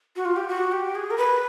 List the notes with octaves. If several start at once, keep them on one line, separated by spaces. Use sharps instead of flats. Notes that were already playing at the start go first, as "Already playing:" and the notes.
F#4
F4
G4
F#4
G4
G#4
A#4
B4